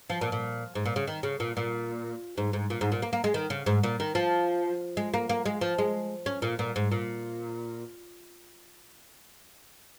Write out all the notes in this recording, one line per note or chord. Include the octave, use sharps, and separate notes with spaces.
F3
A#2
A#2
G#2
A#2
C#3
D#3
C#3
A#2
A#2
G#2
G#2
A#2
G#2
A#2
A#3
A#3
G#3
D#3
C#3
G#2
A#2
D#3
F3
G#3
A#3
A#3
G#3
F3
G#3
C#4
A#2
A#2
G#2
A#2